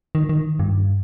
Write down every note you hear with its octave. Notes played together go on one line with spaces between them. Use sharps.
D#3
D#3
G2